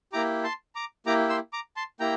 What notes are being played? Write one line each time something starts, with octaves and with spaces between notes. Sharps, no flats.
A#3 E4 G4 A#5 D6
A5 C6
A#5 D6
A#3 E4 G4 A#5 D6
C6 E6
A#5 D6
A5 C6
A#3 E4 G4 G5 A#5